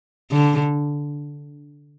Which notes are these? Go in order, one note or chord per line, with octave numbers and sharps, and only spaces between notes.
D3